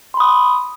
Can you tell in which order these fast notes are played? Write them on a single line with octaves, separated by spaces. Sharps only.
C6 B5 D#6